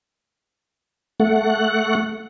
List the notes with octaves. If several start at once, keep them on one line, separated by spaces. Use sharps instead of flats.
A3 F#5